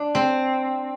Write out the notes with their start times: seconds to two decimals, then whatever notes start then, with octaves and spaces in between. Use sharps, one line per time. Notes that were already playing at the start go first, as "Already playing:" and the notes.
Already playing: D4
0.15 C4